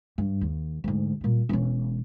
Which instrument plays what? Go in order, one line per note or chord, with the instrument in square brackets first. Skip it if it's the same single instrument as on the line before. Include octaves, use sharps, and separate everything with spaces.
[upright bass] G2
D#2
D2 G#2
A#2 G3
E1 C#4